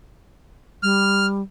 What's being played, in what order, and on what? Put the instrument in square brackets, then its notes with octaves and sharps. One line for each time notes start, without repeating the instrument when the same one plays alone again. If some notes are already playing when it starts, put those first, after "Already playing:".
[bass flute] G3 [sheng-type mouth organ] F6